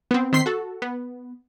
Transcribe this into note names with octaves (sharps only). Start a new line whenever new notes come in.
B3 C4
D#3 C4 C6 B6 C7
F#4 A4
B3